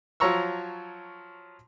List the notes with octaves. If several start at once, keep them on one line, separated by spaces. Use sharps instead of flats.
F3 F#3 C#5 A#5 C#6 E6